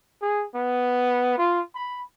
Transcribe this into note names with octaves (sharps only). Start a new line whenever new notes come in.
G#4
B3
F4
B5